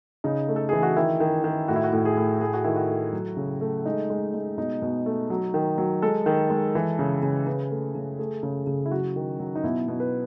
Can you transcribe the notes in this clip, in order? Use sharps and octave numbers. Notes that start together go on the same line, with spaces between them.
C#3 D#4
A3
A4
E3 G#4
F#4
D#3 E4
D#3
D#3
A2 F#4
E4
F#4
A2
G#4
A2
A3 G#4
F#4
D#3 E4
F#4
A3
F#3
C#3
A3
G#3 D#4
G#3
G#3
B2 D#4
B2
A3
F#3
D#3
F#3
G#3 A4
D#3
G#3
E3
C#3
C#3
C#3 B4
A3
C#3
A3 G#4
C#3
C#3
E4
F#3 F#4
D#3
F#3
D#4
B2 E4
B2
B4